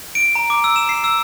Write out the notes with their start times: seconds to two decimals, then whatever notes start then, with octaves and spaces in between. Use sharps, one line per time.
0.15 D7
0.35 A#5
0.50 D6
0.64 E6
0.76 E7
0.89 C7
1.04 E6